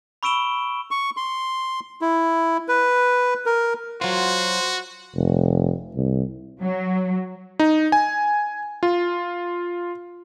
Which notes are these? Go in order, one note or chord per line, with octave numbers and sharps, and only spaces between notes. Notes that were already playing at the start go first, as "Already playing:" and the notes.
B5 C#6 E6 D7 E7 G7
C#6
C6
E4
B4
A#4
F#3 F4 F#4 C5
F1
C2
F#3
D#4
G#5
F4